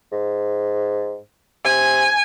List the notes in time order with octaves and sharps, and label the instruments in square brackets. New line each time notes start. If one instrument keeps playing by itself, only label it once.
[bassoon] G#2
[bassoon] C3 [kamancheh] G#5